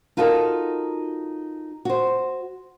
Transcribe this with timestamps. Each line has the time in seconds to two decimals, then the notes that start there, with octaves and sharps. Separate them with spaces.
0.17 D#4 F4 F#4 A4 A#4 D#5
1.85 F#4 C5